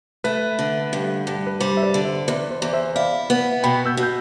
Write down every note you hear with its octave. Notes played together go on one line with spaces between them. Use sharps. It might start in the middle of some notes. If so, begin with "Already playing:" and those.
A3 B4
D3
G2
G2
B4
G3 C5
E5
B4 D5
D3
C5 E5
E2 B4 D5
C5
E2 D5
C5 E5
E4 D5 F5
B3
B2 G5 B5
E6 G6
B2
G6